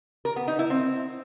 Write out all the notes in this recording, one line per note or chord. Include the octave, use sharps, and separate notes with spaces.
A#4
B3
D#4
E4
C4